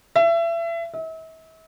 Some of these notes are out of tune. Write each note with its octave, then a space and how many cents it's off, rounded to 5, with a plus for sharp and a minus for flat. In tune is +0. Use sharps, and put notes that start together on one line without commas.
E5 +30
E5 -40